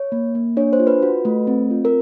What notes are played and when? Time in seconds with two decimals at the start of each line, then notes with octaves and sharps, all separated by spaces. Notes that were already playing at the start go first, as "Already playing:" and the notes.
Already playing: C#5
0.12 A#3
0.35 A#3
0.57 D4 C#5
0.73 C5
0.80 F4
0.87 B4
1.02 F#4
1.25 A3
1.47 C4
1.71 F4
1.85 A#4